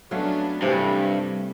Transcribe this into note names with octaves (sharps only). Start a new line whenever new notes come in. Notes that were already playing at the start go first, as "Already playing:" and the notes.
F#3 A3 B3 C#4 D4 F5
G2 C3 E3 G3 A3